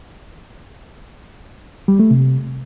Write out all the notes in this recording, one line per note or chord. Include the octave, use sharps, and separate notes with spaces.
G3
A3
C3